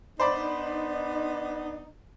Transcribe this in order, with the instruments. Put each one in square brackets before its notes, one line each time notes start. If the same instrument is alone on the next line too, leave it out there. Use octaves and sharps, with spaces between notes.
[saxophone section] B3 D4 D#4 [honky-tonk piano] C5 D5 B5